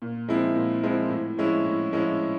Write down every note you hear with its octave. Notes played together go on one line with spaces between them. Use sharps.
A#2
F3 G#3 C4 E4
A#2
F3 G#3 C4 E4
A2
F3 G#3 C#4 E4
A2
F3 G#3 C#4 E4